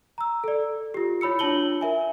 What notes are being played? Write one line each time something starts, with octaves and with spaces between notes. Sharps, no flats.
A#5 E6
A4 D5
F4 G4
E4 C#5 B5 E6 C#7
D4 F4 C#5 A5 F#7 G7
A#4 E5 G#5